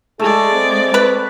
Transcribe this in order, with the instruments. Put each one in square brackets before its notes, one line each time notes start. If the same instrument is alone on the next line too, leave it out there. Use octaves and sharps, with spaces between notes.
[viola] G#3 D5 [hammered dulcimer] A3 [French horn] G#4
[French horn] C4
[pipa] B4